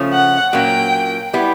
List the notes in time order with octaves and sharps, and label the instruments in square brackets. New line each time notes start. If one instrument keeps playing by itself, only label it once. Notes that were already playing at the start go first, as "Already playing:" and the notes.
Already playing: [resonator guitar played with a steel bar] C#3 F3 A3 C#4 F4
[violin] F#5
[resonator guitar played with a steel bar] A#2 F#3 A#3 C#4 [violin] G5
[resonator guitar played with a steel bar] G3 B3 E4 G4